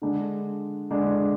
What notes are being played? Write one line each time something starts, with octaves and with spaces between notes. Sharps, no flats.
D3 G#3 D4
D3 G#3 D4